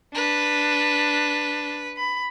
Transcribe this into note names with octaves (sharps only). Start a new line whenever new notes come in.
D4 B4
B5